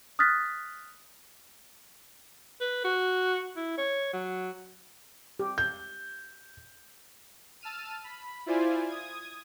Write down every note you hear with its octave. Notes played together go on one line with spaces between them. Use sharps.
D#6 F6 F#6 A6 B6
B4
F#4
E4
C#5
F#3
G4
G6
A5 E6 F6 D#7
B5
E4 F4 C5 D5 G#5
D#6 G#6